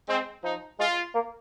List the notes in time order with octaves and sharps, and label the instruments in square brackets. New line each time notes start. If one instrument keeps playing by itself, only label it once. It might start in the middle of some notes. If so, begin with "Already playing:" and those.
[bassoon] G#3 [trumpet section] C4
[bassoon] F3 [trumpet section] D#4
[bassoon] G#3 [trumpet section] F4
[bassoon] A#3